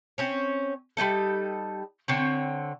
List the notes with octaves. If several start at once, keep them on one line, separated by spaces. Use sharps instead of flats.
C4 C#4 C#5
G3 C#4 D#4 A4
D3 C4 C#5